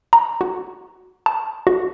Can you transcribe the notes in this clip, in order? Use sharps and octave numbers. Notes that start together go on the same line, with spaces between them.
A#5
F#4
A5
F#4